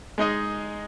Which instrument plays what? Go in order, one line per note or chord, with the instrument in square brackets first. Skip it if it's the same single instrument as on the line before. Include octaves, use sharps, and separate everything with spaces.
[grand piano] G#3 D#4 G#4 D#5